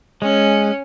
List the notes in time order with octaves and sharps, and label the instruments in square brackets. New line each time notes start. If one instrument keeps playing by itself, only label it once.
[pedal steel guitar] G#3 [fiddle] C#4